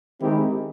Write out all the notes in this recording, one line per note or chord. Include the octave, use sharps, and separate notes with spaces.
D#3 G#3 C4 E4 G4